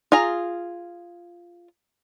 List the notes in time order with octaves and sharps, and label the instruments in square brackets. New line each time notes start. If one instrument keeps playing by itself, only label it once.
[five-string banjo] F4 G#4 A#5